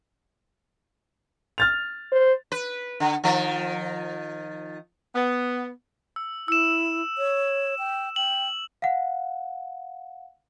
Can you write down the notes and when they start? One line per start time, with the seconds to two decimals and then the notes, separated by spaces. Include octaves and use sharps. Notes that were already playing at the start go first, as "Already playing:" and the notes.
1.58 F6 A6 F7
2.12 C5
2.52 B4
3.00 D3
3.24 D#3 F3
5.15 B3
6.16 E6
6.48 E4 E6 E7
7.18 C#5
7.79 G5
8.16 G5 F#7
8.82 F5 F#5